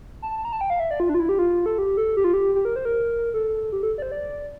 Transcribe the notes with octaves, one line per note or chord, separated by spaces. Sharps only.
A5
A#5
A5
G5
F5
E5
D5
F4
D4
F4
E4
G4
F4
A4
G4
A4
G4
F4
G4
G4
A#4
C5
A#4
A4
G4
A4
D5
C5
D5